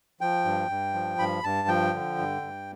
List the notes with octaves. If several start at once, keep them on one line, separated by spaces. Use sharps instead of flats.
F3 G5
G2
G2
F3
G2 B5
G2 A5
F3 G5
D3
G2
G2